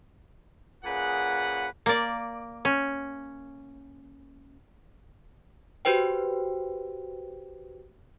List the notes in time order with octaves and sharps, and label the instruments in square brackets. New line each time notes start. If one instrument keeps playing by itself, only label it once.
[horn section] A#2 C#3 G#4 B4 F#5
[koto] A#3 D5
C#4
[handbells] F#4 G4 B4 C5 G5